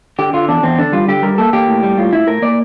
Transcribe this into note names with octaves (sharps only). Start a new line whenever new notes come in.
D3 G4
D3 F4
E2 D4
E2 C4
D3 D4
G3 F4
D3 G4
G3 A#4
A#3 A4
A#3 G4
A2
G3
A2 F4
A2 E4
A2 A#4
A#3 D5